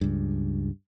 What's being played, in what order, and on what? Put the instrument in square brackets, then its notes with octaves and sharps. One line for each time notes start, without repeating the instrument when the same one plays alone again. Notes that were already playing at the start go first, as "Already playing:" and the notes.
[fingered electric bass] C#2 G2